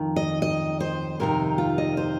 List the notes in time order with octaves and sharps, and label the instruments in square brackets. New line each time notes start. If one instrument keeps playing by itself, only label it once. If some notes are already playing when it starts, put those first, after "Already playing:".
Already playing: [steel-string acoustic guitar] F2 D#3
D#5
D#5
C5
F2 C3 D#3 A#4
F4
D#5
C5